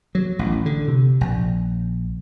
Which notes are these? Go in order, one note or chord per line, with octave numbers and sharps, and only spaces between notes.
F#3
A1
D3
C3
A#1